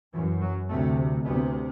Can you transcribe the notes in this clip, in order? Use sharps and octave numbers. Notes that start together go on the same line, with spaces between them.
F#2 E3
F#3
D2 C3 A3
D2 C3 B3